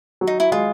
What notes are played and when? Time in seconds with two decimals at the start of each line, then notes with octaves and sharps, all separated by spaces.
0.21 F#3
0.27 D#4
0.40 E4
0.52 G#3 F4